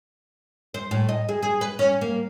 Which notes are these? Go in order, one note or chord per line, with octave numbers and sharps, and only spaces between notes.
C5
A2
D#5
G#4
G#4
B4
C#4
A#3